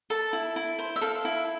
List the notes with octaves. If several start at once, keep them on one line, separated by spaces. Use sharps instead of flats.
A4 A5
E4
E4
C5
E5
A4 F5
E4